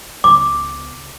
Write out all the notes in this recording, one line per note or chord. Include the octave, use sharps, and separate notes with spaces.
C#2 B3 D6